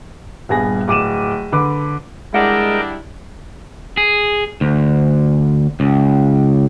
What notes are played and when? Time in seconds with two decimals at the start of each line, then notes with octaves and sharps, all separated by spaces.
0.49 D#1 G2 B3 G#4 A#6
0.88 D1 D6 D#7 E7
1.52 D3 B4 D6
2.34 G3 G#3 D4 E4 A#4 D#5 F#5 G5
3.97 G#4
4.61 D2
5.80 C#2